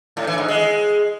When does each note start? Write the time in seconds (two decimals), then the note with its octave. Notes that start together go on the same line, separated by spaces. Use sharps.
0.17 A2
0.27 E3
0.38 G#2
0.48 G#3